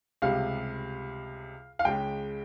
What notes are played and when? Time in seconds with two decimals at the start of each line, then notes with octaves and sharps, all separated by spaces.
0.22 C#2 C3 G3 F5
1.79 F5
1.85 C#2 C#3 G#3 G5